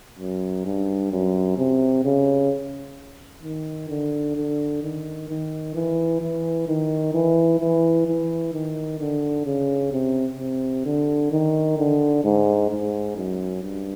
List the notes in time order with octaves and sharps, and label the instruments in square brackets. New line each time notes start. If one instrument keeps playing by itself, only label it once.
[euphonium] F#2
G2
F#2
C3
C#3
D#3
D3
D3
D#3
D#3
E3
E3
D#3
E3
E3
E3
D#3
D3
C#3
C3
C3
D3
D#3
D3
G#2
G#2
F#2
G2